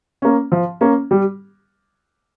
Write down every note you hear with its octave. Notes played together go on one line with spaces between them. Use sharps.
A#3 C#4
F3
A#3 C#4
G3